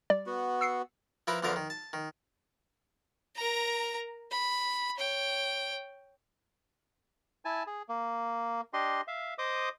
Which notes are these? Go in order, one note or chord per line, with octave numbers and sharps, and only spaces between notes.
G3 D5
B3 F#4
E6 C7 C#7
F3 E4 A#4 B4
E2 D3 F3 A#4 F5
D#3
A5
D#3
A#4 A#5
B5
C#5 G5
E4 G#5 A5
G#4
A#3
D4 G4 D#5 C6
E5 F5
C5 D#5 D6 D#6